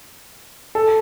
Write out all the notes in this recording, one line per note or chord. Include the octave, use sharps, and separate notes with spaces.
A4